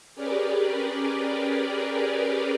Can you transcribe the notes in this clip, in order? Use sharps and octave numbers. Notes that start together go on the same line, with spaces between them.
C#4 G4 G#4 A#4 B4 D5